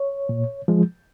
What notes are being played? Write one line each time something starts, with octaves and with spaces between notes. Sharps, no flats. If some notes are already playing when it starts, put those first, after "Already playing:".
Already playing: C#5
A#2
F3 G#3